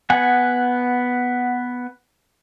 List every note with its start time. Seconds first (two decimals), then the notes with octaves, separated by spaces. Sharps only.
0.10 B3 F#5 G#5